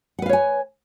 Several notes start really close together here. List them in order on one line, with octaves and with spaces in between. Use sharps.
F#5 B4 F5 C#5 G#5